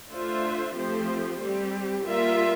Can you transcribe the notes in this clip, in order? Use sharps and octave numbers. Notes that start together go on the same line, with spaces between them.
A3 D4 F4 C5 E5
F3 A3 C4 G4 C5
G3 C4 G4
G3 A#3 F4 A#4 E5